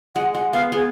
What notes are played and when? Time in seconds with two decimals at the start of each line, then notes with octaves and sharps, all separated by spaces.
0.15 G#3 F#5
0.34 G#3 F#5
0.53 B3 F5
0.72 B3 G#4